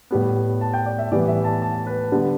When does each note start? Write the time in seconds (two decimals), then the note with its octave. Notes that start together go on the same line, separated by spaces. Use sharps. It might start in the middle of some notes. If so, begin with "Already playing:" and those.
0.11 A2 G3 B3
0.61 A5
0.73 G5
0.86 D5
0.98 E5
1.11 A2 E3 G3 B3 D5
1.28 E5
1.44 A5
1.62 A5
1.87 B4
2.12 D3 G3 B3